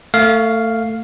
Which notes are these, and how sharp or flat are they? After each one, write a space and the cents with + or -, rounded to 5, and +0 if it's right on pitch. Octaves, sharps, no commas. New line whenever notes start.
A3 +25 F5 +0